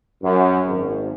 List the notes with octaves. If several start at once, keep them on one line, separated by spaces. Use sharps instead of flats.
F#2
G#1